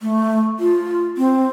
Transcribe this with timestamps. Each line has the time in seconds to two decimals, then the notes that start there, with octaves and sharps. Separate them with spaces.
0.01 A3
0.60 F4
1.17 C4